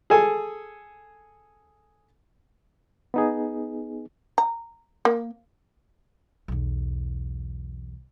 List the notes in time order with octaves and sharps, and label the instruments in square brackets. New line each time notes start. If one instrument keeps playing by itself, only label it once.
[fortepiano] G#4 A4 G#5
[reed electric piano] B3 D#4 G#4
[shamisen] A#5
A#3
[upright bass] B1 E2